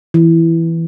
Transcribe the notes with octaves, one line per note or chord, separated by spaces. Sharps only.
E3